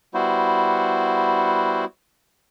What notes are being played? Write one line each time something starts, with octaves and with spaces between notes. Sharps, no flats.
G3 B3 E4 F#4 C5